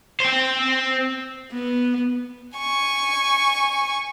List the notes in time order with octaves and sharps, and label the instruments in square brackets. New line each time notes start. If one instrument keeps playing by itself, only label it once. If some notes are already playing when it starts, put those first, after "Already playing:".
[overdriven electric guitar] C4 C5
[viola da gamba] B3
[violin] G#5 C#6